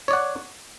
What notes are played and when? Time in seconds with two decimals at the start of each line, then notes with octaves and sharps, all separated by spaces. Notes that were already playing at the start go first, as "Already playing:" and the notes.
0.08 C#5
0.11 D5
0.13 F#5